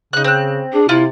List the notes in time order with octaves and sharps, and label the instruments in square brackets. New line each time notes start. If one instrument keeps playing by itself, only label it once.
[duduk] C#3 [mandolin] D#4 F#6
[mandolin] C4 F#6
[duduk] D4 [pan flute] G#4
[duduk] C3 [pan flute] E4 [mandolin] F4